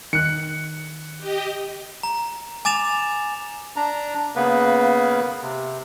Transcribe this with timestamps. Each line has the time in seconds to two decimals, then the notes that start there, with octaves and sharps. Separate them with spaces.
0.13 D#3 F#6 C#7
1.17 G4 D#5
2.03 A#5
2.65 G#5 D6 A6 E7 F7
3.76 D4 A#5
4.36 C#3 A#3 B3 B4
5.42 C3